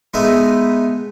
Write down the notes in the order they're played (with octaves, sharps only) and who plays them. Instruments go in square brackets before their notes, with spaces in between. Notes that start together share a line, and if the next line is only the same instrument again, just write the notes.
[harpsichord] G#3 A3 B3 D#4 B4